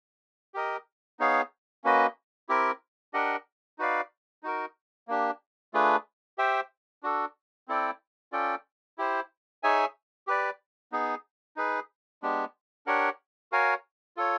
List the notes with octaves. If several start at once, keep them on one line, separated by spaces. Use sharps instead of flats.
G4 A#4 D#5
B3 D#4 G#4 C#5 F5
A#3 C#4 F#4 B4 D#5
C4 E4 G4 A#4
D4 G4 A#4 D#5 F#5
D#4 F#4 B4 D5 F5
D#4 F#4 A#4
A#3 D4 G4
A3 D4 F4 G#4 B4
G4 C5 E5 G5
D4 F#4 A4
C4 E4 A4 D5 G5
C#4 F4 A4 D5 G5
E4 G4 C5
D#4 G#4 C#5 E5 G#5
G4 B4 D5
B3 D#4 G#4
D#4 G#4 B4
G#3 B3 D4 G4
D4 G4 A#4 C#5 F#5
F#4 A#4 C#5 F5 G#5
F4 A4 C#5